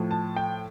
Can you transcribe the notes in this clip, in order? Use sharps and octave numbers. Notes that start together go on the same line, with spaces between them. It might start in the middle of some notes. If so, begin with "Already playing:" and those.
Already playing: A2 F3
A5
G5